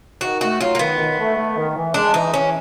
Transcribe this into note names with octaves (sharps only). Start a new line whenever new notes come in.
D#3 F#4
A3 F#4
F#3 F4
A#3
D#3 B3
D#3
A3
A3
D#3
E3
G#3 D4
E3 D#4
E3 C#4